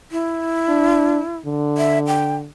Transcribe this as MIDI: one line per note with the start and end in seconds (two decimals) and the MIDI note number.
0.12 1.37 64
0.68 1.20 62
1.46 2.47 50
1.78 1.99 76
2.07 2.35 79